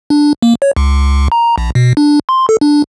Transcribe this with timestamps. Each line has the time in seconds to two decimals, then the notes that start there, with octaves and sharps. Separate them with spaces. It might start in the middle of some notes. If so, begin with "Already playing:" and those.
0.10 D4
0.43 A#3
0.62 C#5
0.77 C#2
1.32 A#5
1.58 A#1
1.75 B2
1.97 D4
2.29 C6
2.49 A4
2.61 D4